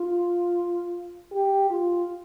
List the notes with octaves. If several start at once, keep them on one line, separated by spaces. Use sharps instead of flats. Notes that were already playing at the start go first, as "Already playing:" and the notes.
Already playing: F4
G4
F4